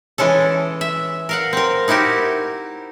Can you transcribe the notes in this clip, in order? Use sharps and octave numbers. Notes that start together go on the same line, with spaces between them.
E3 G#3 C#4 A4
E5
A#4 F5 F#5
C4 A#4
D#4 E4 F#4 G4 A#4